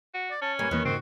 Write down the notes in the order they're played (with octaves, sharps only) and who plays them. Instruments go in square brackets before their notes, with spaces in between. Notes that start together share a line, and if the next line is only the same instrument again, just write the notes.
[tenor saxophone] F#4
[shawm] D5
[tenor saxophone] C#4 [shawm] A5
[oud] G2 A#3 [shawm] G#5
[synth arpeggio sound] E2 E3 A#3 [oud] D#3 [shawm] B4
[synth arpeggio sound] G#2 C#3 [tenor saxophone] C4 [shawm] F#4